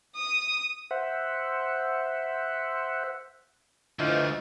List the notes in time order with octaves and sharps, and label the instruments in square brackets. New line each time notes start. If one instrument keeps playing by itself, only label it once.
[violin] D#6
[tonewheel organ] C5 E5 F#5
[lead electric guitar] D3 A3 [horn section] E3 F3 [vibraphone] D#5